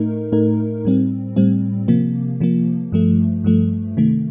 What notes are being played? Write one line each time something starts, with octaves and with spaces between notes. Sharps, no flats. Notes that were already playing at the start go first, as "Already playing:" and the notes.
Already playing: A2 A3 D#4 A#4
A2 A3 D#4 A#4
A2 G3 C4
A2 G3 C4
C3 F3 A#3
C3 F3 A#3
G2 F3 A3
G2 F3 A3
C3 D#3 A3